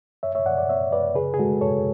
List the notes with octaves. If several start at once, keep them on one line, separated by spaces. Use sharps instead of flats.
F#2 C#5 E5
C#5 E5
F#2 D5 F#5
D5 F#5
B3 C#5 E5
F#2 B4 D5
C#3 G#4 B4
G#4
G#3 F#4 A4
F#2 A4 C#5